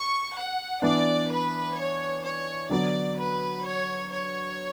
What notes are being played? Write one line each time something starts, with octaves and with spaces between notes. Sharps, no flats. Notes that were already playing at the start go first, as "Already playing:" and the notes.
Already playing: C#6
F#5
E3 B3 D4 D5
B4
C#5
C#5
D3 F#3 B3 D5
B4
C#5
C#5